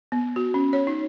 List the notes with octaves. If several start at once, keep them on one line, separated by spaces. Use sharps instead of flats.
B3
F#4
C#4
C#5
D#4